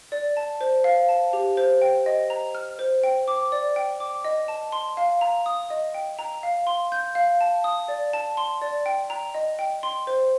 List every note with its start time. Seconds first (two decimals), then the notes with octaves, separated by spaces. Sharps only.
0.12 D5
0.37 A5
0.61 C5
0.84 F5
1.09 A5
1.33 G4
1.57 C5
1.82 G5
2.06 D#5
2.30 A#5
2.55 F6
2.79 C5
3.04 G5
3.28 D6
3.52 D5
3.76 G5
4.00 D6
4.25 D#5
4.48 A5
4.72 C6
4.97 F5
5.21 A#5
5.46 D#6
5.70 D#5
5.94 G5
6.19 A#5
6.43 F5
6.67 C6
6.92 G6
7.15 F5
7.41 A5
7.64 D#6
7.88 D5
8.13 A5
8.37 C6
8.62 D5
8.86 G5
9.10 A#5
9.34 D#5
9.59 G5
9.83 C6
10.07 C5